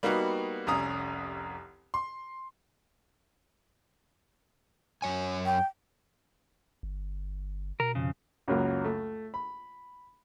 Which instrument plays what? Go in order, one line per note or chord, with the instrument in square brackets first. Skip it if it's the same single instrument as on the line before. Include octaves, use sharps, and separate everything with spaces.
[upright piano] G3 A#3 B3 D#4 F#4
F1 C2 C#4 A#5 D#6
C6
[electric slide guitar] F#2 C#5 G#5
[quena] G5
[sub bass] G1
[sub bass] B2 [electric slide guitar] A#4
[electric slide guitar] F2 C#3
[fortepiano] C#2 F#2 F#3 A#3
A3
B5